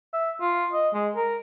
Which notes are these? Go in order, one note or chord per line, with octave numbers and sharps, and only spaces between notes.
E5
F4
D#5
G#3
A#4